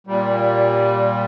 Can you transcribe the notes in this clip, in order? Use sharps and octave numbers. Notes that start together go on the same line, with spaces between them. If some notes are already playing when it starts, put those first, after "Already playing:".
A#2 G3